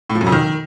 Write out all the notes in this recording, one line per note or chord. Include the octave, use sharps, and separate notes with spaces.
A2
F3
F#2
F2
D#3